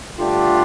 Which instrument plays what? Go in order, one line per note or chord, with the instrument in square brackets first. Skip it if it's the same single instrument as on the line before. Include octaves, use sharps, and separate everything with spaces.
[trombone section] G2 D3 A3 D4 G4 [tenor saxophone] F4